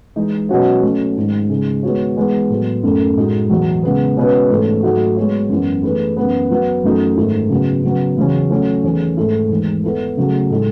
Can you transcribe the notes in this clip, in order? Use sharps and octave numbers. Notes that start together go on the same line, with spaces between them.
E3 G#3 D#4
B2 F#3 C#4 F#4 C#5
F#3 A3 C#4
G#2 D#3 G#3
C#3 G#3 D#4 G#4
D#3 G#3 B3 F#4 C#5
E3 G#3 B3 D#4
A2 F#3 B3
F#2 D#3 A3 D#4
A2 G#3 D#4 F#4
E2 B2 F#3
C#3 G#3 B3
B2 G#3 C#4 F#4 B4
G#2 E3 A3 C#4
G#2 F#3 A3 D#4 F#4
G#3 B3 F#4 C#5
F#2 E3 B3 E4
E3 A3 D#4 G#4 B4
F#2 E3 B3
F#3 B3 E4
F#2 E3 A3 D#4 F#4
G#2 D#3 A3 E4
C#3 F#3 B3
C#3 F#3 B3
E2 C#3 F#3 C#4
F#3 A3 C#4 E4
E2 D#3 A3 C#4 G#4
G#2 D#3 A3 E4 A4
E2 D#3 G#3
E3 B3 E4 A4
C#3 F#3 A3
A2 G#3 D#4 A4